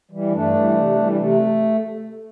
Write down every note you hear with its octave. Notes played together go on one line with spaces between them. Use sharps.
E3 G3
G2 A3 D4
E3 G3
C3
E3 G3
C3 A3